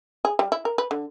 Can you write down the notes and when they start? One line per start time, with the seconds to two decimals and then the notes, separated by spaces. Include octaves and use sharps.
0.25 G#4
0.39 G3
0.52 E4
0.65 A#4
0.78 B4
0.91 D3